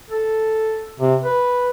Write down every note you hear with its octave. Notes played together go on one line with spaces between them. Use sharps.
A4
C3
B4